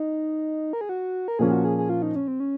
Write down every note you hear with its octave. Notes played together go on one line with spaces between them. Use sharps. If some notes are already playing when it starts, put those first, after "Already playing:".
Already playing: D#4
A#4
G#4
F#4
A#4
A#2 F3 A#3 C#4 G#4
F#4
G#4
G#4
F4
D#4
C#4
C4
C#4